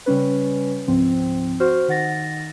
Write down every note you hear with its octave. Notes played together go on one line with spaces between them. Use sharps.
C#3 G3 C#4 B4
C#2 G#2 F3 C4
F#4 C5 F6
D#3 F#5 A6 A#6